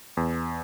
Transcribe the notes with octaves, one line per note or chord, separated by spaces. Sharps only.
E2